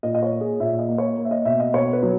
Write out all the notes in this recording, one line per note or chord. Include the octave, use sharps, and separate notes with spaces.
A#2 D#5
D#5
C#5
A#3
G#4
A#2 E5
D#5
A#3
C#5
A#3
E5
D#5
B2 E5
D#5
B2 C#5
B4
F#3